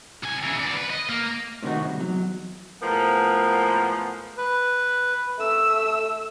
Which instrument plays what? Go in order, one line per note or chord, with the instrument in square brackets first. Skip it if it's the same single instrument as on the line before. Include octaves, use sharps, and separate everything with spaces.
[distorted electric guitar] C2 G#5
C#3 E3
B3 D5
B4
D#5
A#3
[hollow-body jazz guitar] A2 C3 D#3 D#4 F#4
C2 G#2
E2 F#3
[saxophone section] A2 F3 G#3 A#3 B3
[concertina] B4
[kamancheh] A3 E6